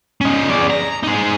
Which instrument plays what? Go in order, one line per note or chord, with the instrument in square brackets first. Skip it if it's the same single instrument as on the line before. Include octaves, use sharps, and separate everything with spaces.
[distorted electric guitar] C#4 D#4
G#4 D5
A#5
D#4 G#4